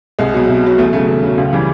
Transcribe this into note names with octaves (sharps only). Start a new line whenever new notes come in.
C2 G#3
B2 F#3
C2
B2 F#3
E2 A3
C#3 F#3 A3
E2
C#3 F#3
C#2
C#3 E3 G3